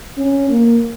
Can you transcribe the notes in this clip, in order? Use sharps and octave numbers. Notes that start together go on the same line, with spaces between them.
C#4
A#3